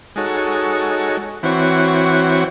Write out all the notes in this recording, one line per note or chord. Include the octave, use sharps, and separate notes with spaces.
G#3 D#4 F#4 A4 C#5
E3 C4 F#4 C#5